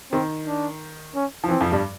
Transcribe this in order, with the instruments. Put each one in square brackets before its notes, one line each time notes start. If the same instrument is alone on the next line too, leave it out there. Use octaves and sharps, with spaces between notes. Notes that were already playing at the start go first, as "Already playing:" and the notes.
[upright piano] D#3 [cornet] C4
[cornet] D4
C#4
[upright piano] F3
[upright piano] E3 [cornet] C4
[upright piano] F2 F3
G2 G3